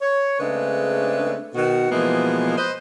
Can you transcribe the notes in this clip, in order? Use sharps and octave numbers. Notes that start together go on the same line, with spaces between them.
C#5
C#3 G#3 A3 C4 D4 B4
B2 D#3 B3 F#4
B2 E3 F3 G#3 A#3 B3
B4 C5 D#5